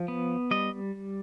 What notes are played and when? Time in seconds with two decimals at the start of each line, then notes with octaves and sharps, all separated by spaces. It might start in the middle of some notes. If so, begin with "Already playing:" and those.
Already playing: F3
0.08 B3
0.51 G3 D#5